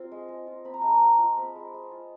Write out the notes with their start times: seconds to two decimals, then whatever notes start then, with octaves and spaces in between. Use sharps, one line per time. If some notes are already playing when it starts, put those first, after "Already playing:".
Already playing: C4 F4
0.11 G#3
0.28 G#3
0.47 F4
0.64 C4 B5
0.74 A#5
0.82 G#3 A5
0.90 A#5
1.01 G#3
1.18 F4
1.37 C4 B5
1.55 G#3
1.74 G#3
1.91 F4